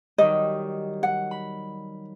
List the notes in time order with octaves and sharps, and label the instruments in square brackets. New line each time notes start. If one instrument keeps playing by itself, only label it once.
[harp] D#3 F#3 G3 [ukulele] D#5
[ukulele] F#5
[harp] B5